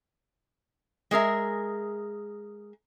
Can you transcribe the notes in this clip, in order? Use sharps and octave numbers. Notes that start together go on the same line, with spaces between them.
G#3 G#4 A#4 E5